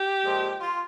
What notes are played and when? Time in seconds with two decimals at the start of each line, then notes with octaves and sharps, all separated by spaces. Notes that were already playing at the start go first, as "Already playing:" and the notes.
Already playing: G4
0.24 A#2 F3 G#3
0.61 F4